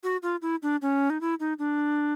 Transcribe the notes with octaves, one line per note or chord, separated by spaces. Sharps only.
F#4
F4
E4
D4
C#4
D#4
E4
D#4
D4